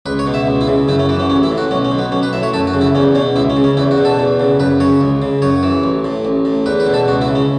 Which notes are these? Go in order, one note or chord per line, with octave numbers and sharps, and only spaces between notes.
C#2 B4
C#5
B2
E5
C#2
E4
C#3
F#2 E4
C#4
E3 B3
C#4
A1 C#4
E4
A2
F#4
B1 C#4
C#4
B2
B3
B1 C#4
B4
A2 E5
C#5
F#2 A4
F#4
C#3
E4
E2 C#4
B2 C#4
C#2 E4
C#4
C#3
C#4
E2 E4
F#4
B2
A4
E2
C#3
F#2 B4
C#3 C#5
C#2
C#3
F#2 C#5
E3
A1
A2
A1
A2
E2 B4
B4
B2
A4
C#2 F#4
E4
C#3
C#4